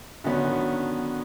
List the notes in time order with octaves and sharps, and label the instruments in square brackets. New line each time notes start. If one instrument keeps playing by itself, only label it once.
[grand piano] D3 D#3 F#3 B3 C#4